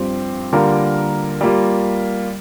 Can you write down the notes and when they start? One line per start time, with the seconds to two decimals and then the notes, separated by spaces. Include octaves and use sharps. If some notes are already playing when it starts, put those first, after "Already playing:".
Already playing: G2 F3 C4 G4
0.53 D3 G3 A#3 F4 A#4
1.41 G3 A#3 F4